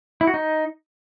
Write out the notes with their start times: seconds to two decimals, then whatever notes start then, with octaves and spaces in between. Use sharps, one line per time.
0.21 E4
0.27 F#4
0.34 D#4